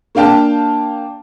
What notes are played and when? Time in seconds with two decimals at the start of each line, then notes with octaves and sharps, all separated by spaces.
0.15 A#3 D4 F5 G5 A5